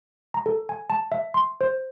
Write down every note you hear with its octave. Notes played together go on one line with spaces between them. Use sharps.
A#5
A4
G#5
A5
E5
C6
C5